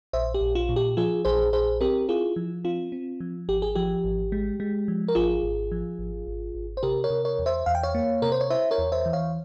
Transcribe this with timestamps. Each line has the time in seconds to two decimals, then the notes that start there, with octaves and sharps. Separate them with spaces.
0.13 A#1 C5 E5
0.34 G4
0.41 A#1
0.55 F4
0.69 A#2
0.76 G4
0.97 F3 F4 G#4
1.25 A#1 G#4 C5
1.53 A#1 G#4 C5
1.81 C4 G4 A#4
2.09 E4 F4 G#4
2.36 F3
2.64 C4 F4
2.92 C4
3.20 F3
3.48 G#1 G4
3.62 G#4
3.75 F3 G4
4.04 G#1
4.32 G#3
4.60 G#3
4.88 F3
5.08 A#4
5.15 G#1 F4 G#4
5.43 G#1
5.72 F3
5.99 G#1
6.27 G#1
6.55 G#1
6.77 C5
6.83 C3 G4 A#4
7.04 A#4 C#5
7.10 C3
7.25 A#4 C#5
7.39 E2
7.46 C5 E5
7.66 E2 F5
7.75 G5
7.83 C#5 F5
7.95 A#3
8.22 C3 A#4
8.32 C5
8.41 C#5
8.50 E4 C5 E5
8.71 A#4 C#5
8.78 E2
8.92 C5 E5
9.06 E3
9.13 C#5 F5